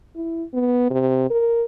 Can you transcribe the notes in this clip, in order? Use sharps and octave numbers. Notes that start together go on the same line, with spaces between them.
E4
B3
C3
A#4